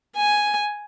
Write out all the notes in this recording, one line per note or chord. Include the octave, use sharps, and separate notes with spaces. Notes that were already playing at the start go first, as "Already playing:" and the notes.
G#5